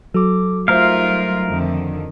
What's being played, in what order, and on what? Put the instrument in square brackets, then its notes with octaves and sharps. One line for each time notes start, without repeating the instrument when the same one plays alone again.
[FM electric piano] F#3 [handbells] A4 D6
[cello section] G3 D#4 F4 [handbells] A3 C5 E5 [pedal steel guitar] A#4 F5
[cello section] F2 D3 D#3